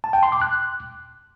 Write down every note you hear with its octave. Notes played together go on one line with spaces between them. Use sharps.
A5
G5
C6
D6
F#6